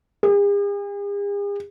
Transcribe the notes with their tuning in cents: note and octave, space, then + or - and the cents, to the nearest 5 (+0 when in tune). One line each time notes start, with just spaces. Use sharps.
G#4 -45